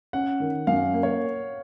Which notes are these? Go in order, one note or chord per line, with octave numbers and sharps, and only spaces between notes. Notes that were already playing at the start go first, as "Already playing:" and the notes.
C#4 F#5
D#3
F#2 F5
A#3
C#5